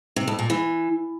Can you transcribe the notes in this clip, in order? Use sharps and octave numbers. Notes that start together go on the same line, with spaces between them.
C3
F2
A#2
E3